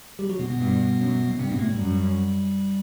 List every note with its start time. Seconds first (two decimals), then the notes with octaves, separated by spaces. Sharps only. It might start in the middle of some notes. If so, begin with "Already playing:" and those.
0.19 G3 G4
0.29 F#3 F#4
0.39 B2 B3
0.50 B2 B3
0.59 G2
0.99 F#2
1.39 G2 C3 C4
1.49 B2 B3
1.59 A2 A3
1.69 G3
1.79 F#2 G3